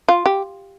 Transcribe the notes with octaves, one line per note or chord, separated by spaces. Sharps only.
F4
G4